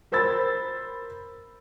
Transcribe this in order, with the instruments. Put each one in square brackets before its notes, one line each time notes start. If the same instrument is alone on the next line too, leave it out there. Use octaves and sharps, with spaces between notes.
[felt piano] A#4 C5 B5 E6 A6